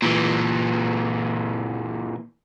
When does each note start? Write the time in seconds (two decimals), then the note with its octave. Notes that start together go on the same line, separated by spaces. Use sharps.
0.02 A#2 E3